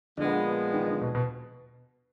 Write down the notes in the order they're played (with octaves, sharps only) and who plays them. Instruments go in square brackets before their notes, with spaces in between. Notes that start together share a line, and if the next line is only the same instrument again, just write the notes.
[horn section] A#2 F3 G#3 B3 [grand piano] D3
[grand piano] D#3
D3
B2
B2